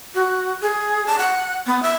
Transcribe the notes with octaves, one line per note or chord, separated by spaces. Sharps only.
F#4
G#4
A5
F#5
B3
E5